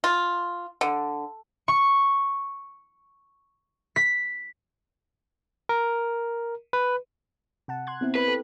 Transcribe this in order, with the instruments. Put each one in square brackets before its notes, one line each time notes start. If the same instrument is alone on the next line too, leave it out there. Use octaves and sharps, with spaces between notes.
[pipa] F4
D3
[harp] C#6
B6
[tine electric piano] A#4
B4
[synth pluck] C3 F#5 A5
C6 F#6 G#6
B3 C4 E4
[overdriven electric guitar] B4
[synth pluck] G4 A4